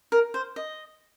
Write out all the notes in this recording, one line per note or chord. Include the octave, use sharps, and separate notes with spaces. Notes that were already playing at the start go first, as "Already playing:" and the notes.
A#4
C5
D#5